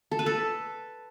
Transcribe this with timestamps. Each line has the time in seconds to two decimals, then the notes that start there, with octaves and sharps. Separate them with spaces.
0.11 A4
0.19 B4
0.26 A4